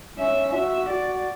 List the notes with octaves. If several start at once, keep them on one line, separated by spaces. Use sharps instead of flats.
C#4 E5
F#4 E5
F#4 D5